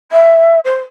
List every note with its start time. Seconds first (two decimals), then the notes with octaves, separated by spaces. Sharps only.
0.11 E5
0.64 C5